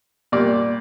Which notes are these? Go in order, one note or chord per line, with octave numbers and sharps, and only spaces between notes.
A#2 G3 D5